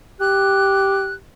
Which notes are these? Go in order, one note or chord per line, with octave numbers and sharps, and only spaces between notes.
G4 F#6